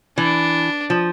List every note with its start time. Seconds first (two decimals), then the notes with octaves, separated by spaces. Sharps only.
0.17 E3 D4
0.90 F3